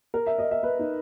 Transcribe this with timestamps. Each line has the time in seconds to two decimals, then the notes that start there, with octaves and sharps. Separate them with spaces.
0.14 A#4
0.27 E5
0.38 D#5
0.51 E5
0.63 B4
0.79 D#4